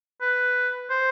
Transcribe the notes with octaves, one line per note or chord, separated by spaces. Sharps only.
B4
C5